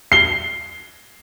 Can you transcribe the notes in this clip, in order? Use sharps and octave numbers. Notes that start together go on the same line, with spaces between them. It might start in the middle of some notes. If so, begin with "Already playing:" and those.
C7 G7